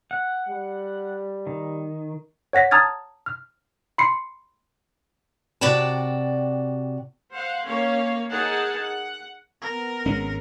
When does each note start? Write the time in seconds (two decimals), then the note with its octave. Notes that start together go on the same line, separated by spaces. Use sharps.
0.11 F#5
0.49 G3
1.47 D#3
2.53 C#5 F#5 A#6 B6
2.71 A5 A#5 D#6 F6 G#6 A6
3.26 F6
3.98 B5 C6 C7 C#7
5.61 C3 F#4 D5 G5 A5
7.33 C5 F5 F#5
7.66 A#3 C#4 C#5 F5
8.31 D#4 G#4 A#4 F#5 G#5 A5
8.83 F#5
9.62 B3 A#4
10.06 G#1 G#3 C#4